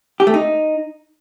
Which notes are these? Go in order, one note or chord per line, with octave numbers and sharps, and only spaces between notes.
G4
A3
D#4